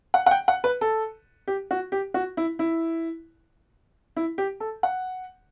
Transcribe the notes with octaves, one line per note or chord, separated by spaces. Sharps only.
F#5
F#5
G5
F#5
B4
A4
G4
F#4
G4
F#4
E4
E4
E4
G4
A4
F#5